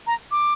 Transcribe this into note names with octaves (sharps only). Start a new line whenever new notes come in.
A#5
D6